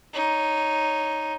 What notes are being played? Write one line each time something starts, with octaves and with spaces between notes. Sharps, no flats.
D#4 C#5